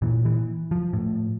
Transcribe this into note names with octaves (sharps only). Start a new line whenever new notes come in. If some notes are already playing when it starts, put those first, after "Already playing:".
A#2 E3
E3
F3
A2